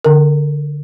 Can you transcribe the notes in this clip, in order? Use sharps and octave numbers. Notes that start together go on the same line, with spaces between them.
D3 A#4